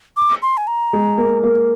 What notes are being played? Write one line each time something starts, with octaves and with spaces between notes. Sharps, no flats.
D6
C6
G#5
A#5
G#3
A#3
A#3